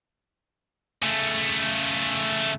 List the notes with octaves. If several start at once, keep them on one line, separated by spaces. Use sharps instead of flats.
C#3 A3